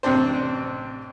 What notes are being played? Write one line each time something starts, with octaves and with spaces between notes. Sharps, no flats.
A1 C3 C4 D4 C5